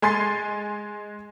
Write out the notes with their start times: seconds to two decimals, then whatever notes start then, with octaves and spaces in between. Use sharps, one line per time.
0.02 G#3 G#5 C6 A6 C7